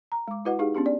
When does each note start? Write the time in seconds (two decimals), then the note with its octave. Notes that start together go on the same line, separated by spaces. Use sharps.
0.12 A#5
0.28 G#3 D6
0.45 E4 F#4 B4 D#5 F#5
0.59 D#4 G4 G#4 F5
0.74 B3 C#4 D4 G4
0.86 D5